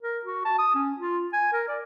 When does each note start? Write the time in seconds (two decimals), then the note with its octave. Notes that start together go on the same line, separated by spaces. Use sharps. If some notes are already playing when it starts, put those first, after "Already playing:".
0.02 A#4
0.25 F#4
0.45 A5
0.59 D#6
0.75 C#4
0.98 F4
1.33 G#5
1.53 A#4
1.68 D5